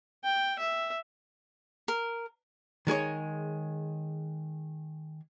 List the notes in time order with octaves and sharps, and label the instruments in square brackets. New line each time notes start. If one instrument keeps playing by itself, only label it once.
[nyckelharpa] G5
E5
[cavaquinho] A#4
[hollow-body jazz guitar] D#3 G#3 G#4 C#5